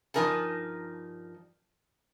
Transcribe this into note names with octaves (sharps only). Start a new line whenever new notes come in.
G2 F3 D#4 A#4 G#5 A5